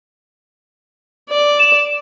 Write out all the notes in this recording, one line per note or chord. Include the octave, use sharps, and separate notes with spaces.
D5
E7